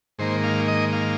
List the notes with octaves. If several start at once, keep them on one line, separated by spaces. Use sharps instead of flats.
G#2 D#3 A#3 C5
F5
D#5
F5